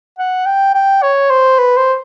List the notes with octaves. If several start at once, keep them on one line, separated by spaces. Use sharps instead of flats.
F#5
G5
G5
C#5
C5
B4
C5